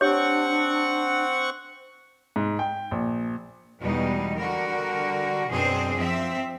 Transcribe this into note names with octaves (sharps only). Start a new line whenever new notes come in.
C4 D4 G4 C#5 F#5 C#6
G#2
G5
A#1
E2 B2 G3 G#3 D#4
D3 G3 F#4 A#4
F#2 B2 C4 D4 G#4 C5
F3 C4 E5